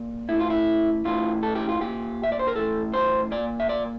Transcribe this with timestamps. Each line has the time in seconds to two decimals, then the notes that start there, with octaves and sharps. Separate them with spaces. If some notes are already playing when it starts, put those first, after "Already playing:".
Already playing: A#2
0.29 A2 E3 E4
0.39 F4
0.50 E4
1.05 A2 E3 F4
1.43 A4
1.55 G4
1.69 F4
1.80 A#2 G4
2.23 E5
2.32 D5
2.39 C5
2.47 A#4
2.55 A2 E3 A4
2.94 C5
3.31 A#2 D5
3.60 E5
3.69 D5